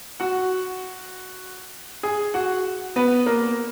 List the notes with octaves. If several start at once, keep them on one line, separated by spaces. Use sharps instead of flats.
F#4 F#5
G#4 G#5
F#4 F#5
B3 B4
A#3 A#4